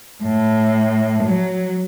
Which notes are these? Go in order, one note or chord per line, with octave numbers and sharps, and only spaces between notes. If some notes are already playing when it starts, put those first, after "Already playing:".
A2
F#3